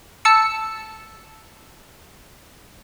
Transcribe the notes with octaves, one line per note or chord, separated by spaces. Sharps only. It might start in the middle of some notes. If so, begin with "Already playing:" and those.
A5 E6 C#7